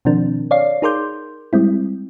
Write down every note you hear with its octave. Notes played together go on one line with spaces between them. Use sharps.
B2 D#3 F3 C4 D4 A#4
C#5 D5 F5 C7
D#4 G#4 A#4 C6 D6 G6
G3 G#3 C4 E4